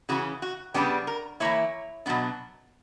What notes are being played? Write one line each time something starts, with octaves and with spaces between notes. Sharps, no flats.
C#3 E3 C#4 F#4
F#4
C#3 G3 B3 D4 G4
A#4
E3 A#3 E4 C#5
B2 F#3 B3 D4